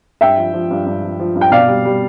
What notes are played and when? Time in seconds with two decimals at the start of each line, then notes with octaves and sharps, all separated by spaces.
0.21 G2 E5 G5
0.38 F3
0.54 F3
0.71 G2
0.86 G2
1.03 F3
1.20 F3
1.35 G2
1.41 G5
1.52 B2 D5 F5
1.68 G3
1.85 G3